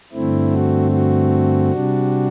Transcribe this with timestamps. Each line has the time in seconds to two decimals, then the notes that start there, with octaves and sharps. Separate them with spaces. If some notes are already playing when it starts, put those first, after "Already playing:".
0.13 G2 D3 A3 C4 E4
0.52 F#4
0.91 F#4
1.72 C3 G3 D4